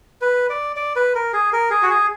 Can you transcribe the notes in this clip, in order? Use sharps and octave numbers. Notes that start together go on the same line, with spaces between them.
B4
D5
D5
B4
A#4
G#4
A#4
G#4
F#4
G#4